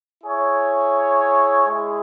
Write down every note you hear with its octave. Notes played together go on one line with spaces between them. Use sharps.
E4 G#4 C#5
G#3 E4 G#4